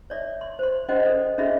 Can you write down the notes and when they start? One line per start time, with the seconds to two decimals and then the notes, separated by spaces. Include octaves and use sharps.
0.10 C#5 D5 E5
0.41 C6
0.59 C5 C6
0.89 C#4 F#4 C5 D#5 F#5 G5
1.03 A4 C5 D5
1.38 C#4 F#4 G#4 D#5 E5 B5